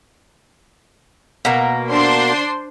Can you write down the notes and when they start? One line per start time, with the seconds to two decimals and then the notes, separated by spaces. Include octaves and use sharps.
1.45 B2 A#3
1.90 D4 C5 C6